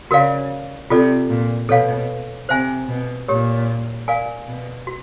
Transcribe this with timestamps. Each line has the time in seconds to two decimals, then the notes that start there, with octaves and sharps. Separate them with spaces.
0.10 C#3 F#4 A#4 D5 F5
0.90 C3 F4 A4 D5
1.29 A#2
1.69 B2 A4 C#5 F5
2.49 C3 C5 E5 G#5
2.88 B2
3.28 A#2 G4 A#4 C#5
4.08 A#4 D5 F5 G#5
4.48 B2
4.87 F#4